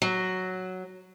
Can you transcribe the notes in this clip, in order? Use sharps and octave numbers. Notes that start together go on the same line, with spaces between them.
F#3